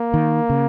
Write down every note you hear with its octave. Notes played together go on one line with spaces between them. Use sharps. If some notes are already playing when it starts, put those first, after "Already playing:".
Already playing: A#3
D#3
C#3